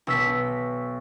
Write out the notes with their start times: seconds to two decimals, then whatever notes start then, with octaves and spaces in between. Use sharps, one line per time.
0.07 B1 E6 B6